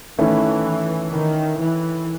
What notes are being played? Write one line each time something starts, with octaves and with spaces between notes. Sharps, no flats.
D#3 E3 A3 C#4 E4
D#3
E3